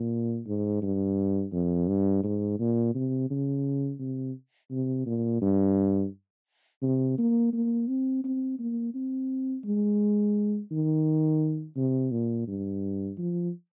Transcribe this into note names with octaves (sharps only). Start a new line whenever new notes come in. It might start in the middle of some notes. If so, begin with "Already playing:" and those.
Already playing: A#2
G#2
G2
F2
G2
G#2
A#2
C3
C#3
C3
C3
A#2
G2
C3
A#3
A#3
C4
C4
A#3
C4
G#3
D#3
C3
A#2
G2
F3